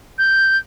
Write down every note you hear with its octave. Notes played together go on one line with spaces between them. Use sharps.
G6